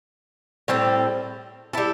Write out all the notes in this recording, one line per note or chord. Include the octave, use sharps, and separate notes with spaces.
A2 G3 C4 A4
G3 E4 A4